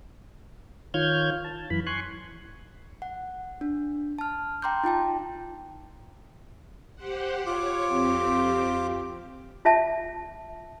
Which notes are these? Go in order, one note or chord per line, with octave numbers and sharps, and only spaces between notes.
D#3 F4 C#5 F6 G6 G#6
A5
F#2 E3 B5
G#5 C6 C#6 F#6
F#5
D4
A5 F6
G5 A#5 C6 D6 G6
D#4 F4 G5 A5
G4 C5 F#5
F4 C#5 D6
F2 C4 G4
F4 E5 A5